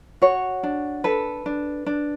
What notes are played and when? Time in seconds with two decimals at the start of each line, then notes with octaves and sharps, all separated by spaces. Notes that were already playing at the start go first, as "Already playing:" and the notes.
0.22 F#4 C#5
0.63 D4
1.04 A4 B4
1.46 D4
1.86 D4